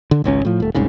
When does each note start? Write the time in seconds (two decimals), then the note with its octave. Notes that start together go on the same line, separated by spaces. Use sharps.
0.11 D3
0.24 G#1 C#2 C4 C#4
0.45 A2 F3
0.60 D#1 A3
0.75 F#1 C2 G#2 C#3